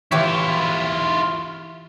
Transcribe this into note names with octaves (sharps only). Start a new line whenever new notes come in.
E3 E4 F4 G4 C#5